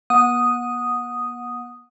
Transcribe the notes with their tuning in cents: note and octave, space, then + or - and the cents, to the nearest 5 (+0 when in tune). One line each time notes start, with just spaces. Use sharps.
B3 -45 F#5 -20 D#6 +0